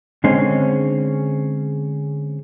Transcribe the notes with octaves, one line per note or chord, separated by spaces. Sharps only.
D3 G#3 C4 C#4